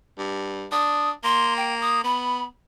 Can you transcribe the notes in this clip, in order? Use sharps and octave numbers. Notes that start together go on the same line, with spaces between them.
G2
D4 D#6
A#3 C6
G5
D#6
B3 B5